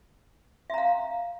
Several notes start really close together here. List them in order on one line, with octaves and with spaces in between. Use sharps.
E5 A#5 F5